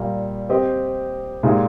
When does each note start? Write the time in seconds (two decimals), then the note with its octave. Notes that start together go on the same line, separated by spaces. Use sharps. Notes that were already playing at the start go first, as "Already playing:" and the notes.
Already playing: A#2 G3 A#3
0.49 C4 G4 C5 D#5
1.43 A#2 G#3 D#4 G4